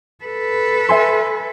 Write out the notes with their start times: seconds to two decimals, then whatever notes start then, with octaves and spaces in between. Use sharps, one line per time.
0.24 A4 B4
0.89 E5 G#5 C6